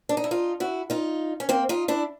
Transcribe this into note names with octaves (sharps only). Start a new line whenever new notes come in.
D4
D#4
E4
D#4 F4
E4 F#4
D#4 F4
C#4
A#3 C4
D#4 F4
D4 E4